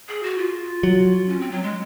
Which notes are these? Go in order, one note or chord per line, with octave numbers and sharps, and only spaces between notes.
G#4
F#4
F4
F#3
C#4
C4
F#3
G#3